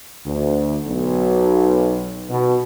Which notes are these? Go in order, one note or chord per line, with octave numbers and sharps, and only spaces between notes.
D2
B1
B2